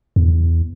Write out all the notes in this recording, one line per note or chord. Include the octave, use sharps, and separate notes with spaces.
E2